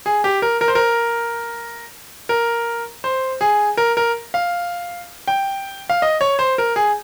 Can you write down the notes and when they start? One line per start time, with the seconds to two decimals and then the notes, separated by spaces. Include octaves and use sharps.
0.06 G#4
0.24 G4
0.42 A#4
0.61 A#4
0.68 C5
0.75 A#4
2.29 A#4
3.04 C5
3.41 G#4
3.77 A#4
3.97 A#4
4.34 F5
5.27 G5
5.90 F5
6.02 D#5
6.21 C#5
6.39 C5
6.58 A#4
6.76 G#4